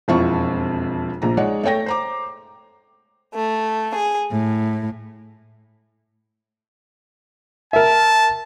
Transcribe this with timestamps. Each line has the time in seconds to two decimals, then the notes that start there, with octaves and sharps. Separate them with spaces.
0.08 E1 F2 C4 E4 F4 C#6
1.22 A#1 A#2 A#5
1.37 G#3 D#4 C#5 D5 F#5
1.63 A3 A4 C#5 G5 A#6
1.86 C5 A#5 D6
3.34 A3
3.95 G#4
4.31 A2
7.73 A#4 E5 A5